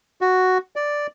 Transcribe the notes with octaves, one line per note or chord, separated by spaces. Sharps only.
F#4
D5